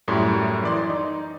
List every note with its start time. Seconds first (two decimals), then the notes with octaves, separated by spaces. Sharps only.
0.08 F#2 A2 G3 E4 C6
0.63 E3 D5 C6
0.89 D#4